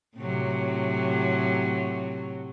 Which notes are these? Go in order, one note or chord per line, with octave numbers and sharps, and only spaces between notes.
A2 C3 F#3